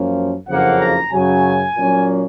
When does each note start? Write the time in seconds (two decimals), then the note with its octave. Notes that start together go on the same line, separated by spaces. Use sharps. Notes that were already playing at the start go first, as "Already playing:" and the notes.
Already playing: F#2 F3 A#3 C#4
0.47 F#1 F2 C#3 F3 A#3 F#5
0.79 A#5
1.12 F#2 C#3 F#3 G#5
1.76 A#2 F#3 A#3 C#4